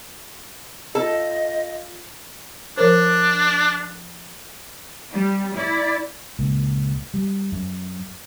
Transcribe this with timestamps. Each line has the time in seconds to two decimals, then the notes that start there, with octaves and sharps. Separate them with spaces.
0.95 F4 A4 D#5
2.77 F3 D4 A#4 C5
5.12 G3
5.53 E4 D5
6.39 C#2 A#2
7.14 G3
7.52 F#2